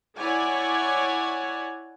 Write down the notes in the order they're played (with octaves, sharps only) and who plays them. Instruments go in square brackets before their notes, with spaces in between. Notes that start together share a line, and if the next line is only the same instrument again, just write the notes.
[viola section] E4 C#5 D5 F#5 G#5